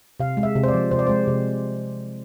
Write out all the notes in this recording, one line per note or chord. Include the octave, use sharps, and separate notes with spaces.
C3 F5
G#3
E5
C3
C5
D5
F3
C3 C5
D5
G#3 C5
C3